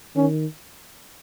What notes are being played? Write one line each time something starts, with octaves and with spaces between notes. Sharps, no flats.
D#3 C#4